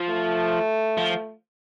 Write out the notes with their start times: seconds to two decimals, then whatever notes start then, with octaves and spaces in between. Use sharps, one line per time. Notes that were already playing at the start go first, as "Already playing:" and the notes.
Already playing: F3
0.10 A3
0.98 F3